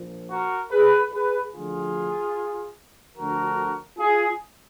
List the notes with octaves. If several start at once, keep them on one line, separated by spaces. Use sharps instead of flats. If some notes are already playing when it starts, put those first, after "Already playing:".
Already playing: A#1 A#2 F3
F#4 A#4
G#4 B4
G#4 B4
D2 D3 F3 F4 G#4
D2 D3 F3 F#4 A#4
F4 G#4